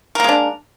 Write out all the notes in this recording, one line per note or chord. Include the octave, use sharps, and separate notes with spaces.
G#3 A#3 D4 A#4